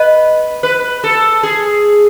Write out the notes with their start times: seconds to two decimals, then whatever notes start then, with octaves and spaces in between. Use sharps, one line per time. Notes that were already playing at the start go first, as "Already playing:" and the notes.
Already playing: B4 D#5
0.63 B4
1.04 A4
1.43 G#4